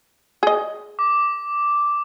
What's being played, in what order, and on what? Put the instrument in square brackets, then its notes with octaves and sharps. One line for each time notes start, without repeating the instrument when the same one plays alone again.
[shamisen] G#4 D#5
[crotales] D6